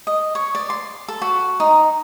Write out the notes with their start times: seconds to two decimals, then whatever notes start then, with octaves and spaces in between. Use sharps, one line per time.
0.07 D#5
0.35 C#5
0.55 D5
0.70 C6
1.08 A4
1.22 F#4
1.60 D#4